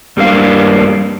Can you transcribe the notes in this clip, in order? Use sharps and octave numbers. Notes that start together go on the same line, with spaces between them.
G2 G3 A#3 D4 F5